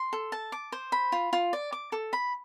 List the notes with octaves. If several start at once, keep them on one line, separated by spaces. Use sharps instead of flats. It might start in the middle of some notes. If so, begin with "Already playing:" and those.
Already playing: C6
A4
A5
D6
C5
B5
F4
F4
D5
D6
A4
B5